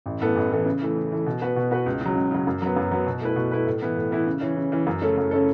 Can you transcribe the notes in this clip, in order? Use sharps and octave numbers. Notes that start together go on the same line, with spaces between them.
A1
A2 E3 B3 A4
A1
A2 E3 B3 A4
C#3
E3 A3
C#3
E3 A3
B2
B3 F#4 B4
B2
B3 F#4 B4
C#2
C#3 F#3
C#2
C#3 F#3
F#2
F#3 B3
F#2
F#3 B3
B2
A3 E4 B4
B2
A3 E4 B4
A2
E3 B3 E4
A2
E3 B3 E4
C#3
E3 C#4
C#3
E3 C#4
F#2
C#3 A3 C#4 A4
F#2
C#3 A3 C#4 A4